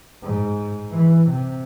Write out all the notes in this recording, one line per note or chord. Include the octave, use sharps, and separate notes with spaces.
G#2
E3
C3